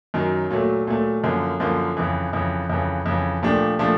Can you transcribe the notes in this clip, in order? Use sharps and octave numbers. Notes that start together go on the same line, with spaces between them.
F#2 D#3 F#3
A#2 F#3 A3
A#2 F#3 A3
F#2 D3 F3 A#3
F#2 D3 F3 A#3
F2 C#3 E3
F2 C#3 E3
F2 C#3 E3
F2 C#3 E3
A#2 F3 A3 D4 G4
A#2 F3 A3 D4 G4